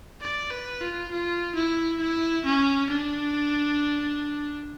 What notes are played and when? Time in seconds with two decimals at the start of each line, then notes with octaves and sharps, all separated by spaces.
0.21 D5
0.50 B4
0.80 F4
1.11 F4
1.55 E4
2.00 E4
2.45 C#4
2.90 D4